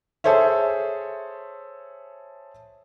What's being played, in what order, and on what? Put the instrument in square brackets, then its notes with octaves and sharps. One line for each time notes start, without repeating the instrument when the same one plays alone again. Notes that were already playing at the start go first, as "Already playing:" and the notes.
[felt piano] G#4 A4 C5 C#5 E5